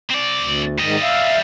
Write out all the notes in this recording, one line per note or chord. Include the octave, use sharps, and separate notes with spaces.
C4 D5
D2
G#2 D#3 G3 D#5
E5 F5